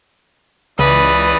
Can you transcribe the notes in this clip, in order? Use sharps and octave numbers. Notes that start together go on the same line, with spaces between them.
C#2 E3 B4 D5 D#6